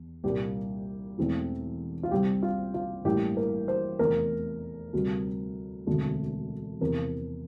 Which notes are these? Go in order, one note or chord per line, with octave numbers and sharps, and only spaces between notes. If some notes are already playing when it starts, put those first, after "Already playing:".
Already playing: E2
C2 A#2 G3 A#3 G4
E1 E2 E3 A3 C4
F4
C2 C3 G3 C4 G4
F4
F4
A1 G2 E3 G3 A#3 G4
A#4
C5
F1 E2 C3 A#4
D2 C3 G3 C4
E1 D2 D3 A3 C4
E2 C3 F3 A#4